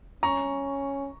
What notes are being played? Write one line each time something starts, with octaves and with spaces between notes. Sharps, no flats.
C#4 A#5 C#6